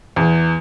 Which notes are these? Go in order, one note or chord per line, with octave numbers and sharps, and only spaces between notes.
E2